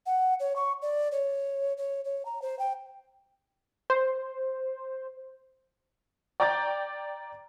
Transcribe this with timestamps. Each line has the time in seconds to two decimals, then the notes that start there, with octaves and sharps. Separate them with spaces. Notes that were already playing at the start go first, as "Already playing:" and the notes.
0.06 F#5
0.40 C#5
0.56 C#6
0.82 D5
1.12 C#5
1.77 C#5
2.05 C#5
2.25 A#5
2.42 C5
2.59 G5
3.90 C5
6.40 D5 G5 A#5 D6 G6 A6